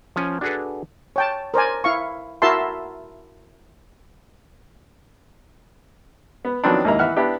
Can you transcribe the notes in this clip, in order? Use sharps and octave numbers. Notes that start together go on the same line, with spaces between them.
F3 C#4 G#5
D4 F#4 G#4 A4 B4
C#5 G5 A5
A#4 C5 D5 G#5
E4 F5 C#6
E4 F#4 A#4 E5 A5 C6
B3
D#3 F3 F#3 B3 C4 D4
D#2 G#2 A#3 E4 A#5
E3 B4 E5 F#5 F6 F#6
B3 D4 E4 G4